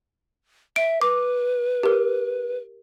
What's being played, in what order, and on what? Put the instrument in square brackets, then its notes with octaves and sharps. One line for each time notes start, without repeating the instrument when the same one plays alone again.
[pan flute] E5 [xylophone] D7
[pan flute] B4 [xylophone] D6
[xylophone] G4 A#4